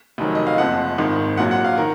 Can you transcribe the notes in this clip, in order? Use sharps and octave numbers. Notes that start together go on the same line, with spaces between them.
F1 F2 D#3 F#3
D#5
F5
F#1 F2 F3 F#5
G#1 G#2 D#3
A#1 A#2 F#3 F#5
F#5
F5
D#3 A#4